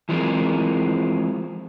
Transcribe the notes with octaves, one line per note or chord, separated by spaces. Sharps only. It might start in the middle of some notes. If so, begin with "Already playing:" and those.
E3 F3 G#3 C4 A#4